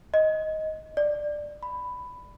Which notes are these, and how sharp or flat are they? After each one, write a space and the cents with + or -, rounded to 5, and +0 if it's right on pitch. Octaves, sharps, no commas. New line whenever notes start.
D#5 +10
D5 +15
B5 +10